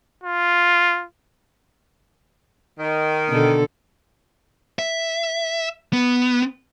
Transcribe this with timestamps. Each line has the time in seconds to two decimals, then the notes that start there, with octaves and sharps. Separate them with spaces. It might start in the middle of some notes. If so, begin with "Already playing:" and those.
0.23 F4
2.79 D#3
3.29 B2 D3 A4
4.79 E5
5.93 B3